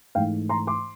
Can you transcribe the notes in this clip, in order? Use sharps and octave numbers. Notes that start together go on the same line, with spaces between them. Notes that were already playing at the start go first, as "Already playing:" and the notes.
G#2 E3 A3 F5 G5
A#5 C6
C6 D6